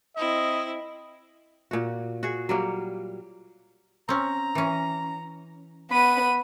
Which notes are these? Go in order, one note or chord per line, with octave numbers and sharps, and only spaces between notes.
C4 E4 D#5
A#2 F#4
F#4 G#4
F#3 G3 A#3
C4 C#4 A#5
E3 C#4
B3 B5 D#7